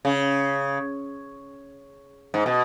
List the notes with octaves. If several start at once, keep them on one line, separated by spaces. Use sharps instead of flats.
C#3
G#2
B2